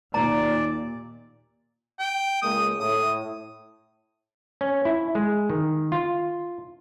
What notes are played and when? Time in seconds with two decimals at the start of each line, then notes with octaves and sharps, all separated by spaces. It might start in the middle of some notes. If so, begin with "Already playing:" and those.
0.14 D#2 A#2 D5 A#5
1.99 G5
2.42 C#2 G#3 A#3 D#6
2.80 A2 D#6
4.61 C#4
4.85 E4
5.15 G#3
5.50 D#3
5.92 F4